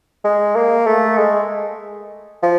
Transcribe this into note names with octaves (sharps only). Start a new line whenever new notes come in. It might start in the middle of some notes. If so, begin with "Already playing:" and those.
G#3
A#3
A3
G#3
F3